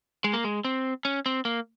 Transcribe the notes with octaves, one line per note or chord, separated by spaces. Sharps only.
G#3
A#3
G#3
C4
C#4
C4
A#3